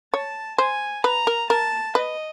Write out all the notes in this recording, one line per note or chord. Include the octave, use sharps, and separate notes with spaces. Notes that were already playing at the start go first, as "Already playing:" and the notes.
C#5 A5
C5 G#5
B4 A#5
A#4
A#4 A5
B4 D#5